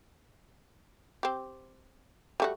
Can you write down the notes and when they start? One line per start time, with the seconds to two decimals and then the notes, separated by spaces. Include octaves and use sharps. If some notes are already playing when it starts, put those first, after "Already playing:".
1.23 C4 G4
2.40 G3 A3 F#4